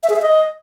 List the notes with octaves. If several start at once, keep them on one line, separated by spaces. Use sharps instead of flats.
E5
G#4
E5
D#5